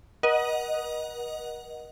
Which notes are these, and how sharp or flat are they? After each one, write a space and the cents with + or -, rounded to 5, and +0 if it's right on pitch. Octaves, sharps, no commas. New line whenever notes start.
A#4 +45 D#5 +0 F#5 +0